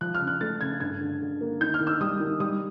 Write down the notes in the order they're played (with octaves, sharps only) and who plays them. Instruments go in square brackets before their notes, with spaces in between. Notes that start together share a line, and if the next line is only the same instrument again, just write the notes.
[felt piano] F3 F#6
F6
C#3
F#6
A3 A6
C#3 G#6
G2 G#6
D3
D3
A#3
D#3 G6
F6
D#3
E6
G3 D#6
D#3
G3 D#6